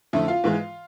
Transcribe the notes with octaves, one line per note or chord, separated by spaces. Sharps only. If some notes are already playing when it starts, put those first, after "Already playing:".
F2 D3 A3 E4 E5
F4 F5
G#2 E3 G#3